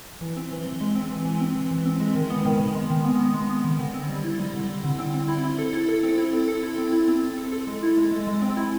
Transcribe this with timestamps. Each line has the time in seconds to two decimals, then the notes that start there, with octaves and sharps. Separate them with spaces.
0.21 E3
0.36 C4
0.52 E3
0.66 E3
0.81 G#3
0.95 C4
1.11 E3
1.25 E3
1.40 C4
1.55 E3
1.71 E3
1.85 C4
2.00 G#3
2.15 D#3
2.30 B3
2.45 D#3
2.59 D#3
2.75 G#3
2.90 D#3
3.04 B3
3.20 B3
3.34 G#3
3.50 B3
3.64 D#3
3.79 D3
3.94 C4
4.09 G3
4.24 E4
4.39 G3
4.54 D3
4.69 G3
4.84 D3
4.99 C4
5.13 C4
5.28 E4
5.43 E4
5.58 A4
5.73 E4
5.88 A4
6.03 C4
6.18 E4
6.33 C4
6.48 A4
6.63 E4
6.78 C4
6.92 E4
7.08 C4
7.22 C4
7.38 A4
7.52 A4
7.67 G#3
7.83 E4
7.97 G#3
8.12 G#3
8.27 G#3
8.42 C4
8.57 E4